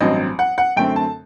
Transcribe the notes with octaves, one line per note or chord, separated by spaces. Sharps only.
A1 G2 F#3 C4 D#5
F#5
F#5
F#2 D3 A3 C4 G5
A5